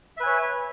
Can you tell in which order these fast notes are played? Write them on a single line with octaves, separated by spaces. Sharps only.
E5 B4 G#5 C#5